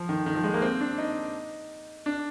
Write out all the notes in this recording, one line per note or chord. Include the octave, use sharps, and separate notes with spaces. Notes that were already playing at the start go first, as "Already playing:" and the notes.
Already playing: F3
D#3
D#3
F3
G#3
A#3
C4
D4
D#4
D4